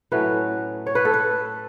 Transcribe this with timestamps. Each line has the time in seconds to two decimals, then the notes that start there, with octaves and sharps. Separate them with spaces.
0.12 A2 F#3 A3 C#4 B4
0.87 C#5
0.95 B4
1.05 A4
1.14 B4